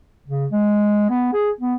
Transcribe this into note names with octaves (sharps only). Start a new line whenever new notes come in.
C#3
G#3
B3
G#4
B3